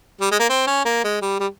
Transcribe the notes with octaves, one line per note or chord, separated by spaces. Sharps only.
G3
G#3
A#3
C4
C#4
A#3
G#3
G3
G3